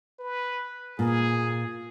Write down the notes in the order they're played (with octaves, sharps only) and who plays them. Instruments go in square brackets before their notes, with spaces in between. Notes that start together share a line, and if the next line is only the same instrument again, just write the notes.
[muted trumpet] B4
[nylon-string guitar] A#2 [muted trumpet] G#4